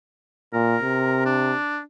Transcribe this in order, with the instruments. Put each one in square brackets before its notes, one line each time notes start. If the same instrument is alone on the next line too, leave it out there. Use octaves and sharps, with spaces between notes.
[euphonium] A#2 [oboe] A#4
[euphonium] C3
[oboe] D4